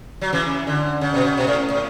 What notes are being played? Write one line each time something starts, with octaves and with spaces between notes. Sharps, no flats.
F#3
C#3 E3
D3
C#3
B2
C#3
B2
A2
A2